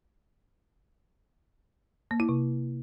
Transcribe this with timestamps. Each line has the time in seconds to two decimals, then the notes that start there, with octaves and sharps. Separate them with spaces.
2.11 A#3
2.20 E4
2.29 C3